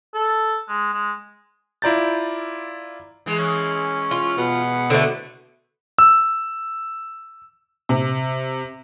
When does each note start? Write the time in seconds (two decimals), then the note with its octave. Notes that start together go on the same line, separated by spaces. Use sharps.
0.14 A4
0.69 G#3
0.94 G#3
1.82 E4 F4 D5 A#5 G6 A6
3.26 E3 G#3
3.39 C#4
4.11 F4
4.38 B2 B3
4.90 D3 A3 E4 C5
5.99 E6
7.89 C3